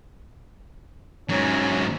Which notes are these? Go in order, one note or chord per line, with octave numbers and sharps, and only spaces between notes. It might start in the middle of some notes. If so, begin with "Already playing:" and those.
G#2 F#3 C#4